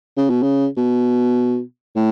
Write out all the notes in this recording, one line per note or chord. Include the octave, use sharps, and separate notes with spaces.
C#3
B2
C#3
B2
A2